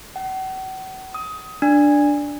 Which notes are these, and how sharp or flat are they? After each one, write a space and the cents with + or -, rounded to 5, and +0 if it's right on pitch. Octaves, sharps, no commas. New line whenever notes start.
F#5 +40
D#6 +20
D4 +0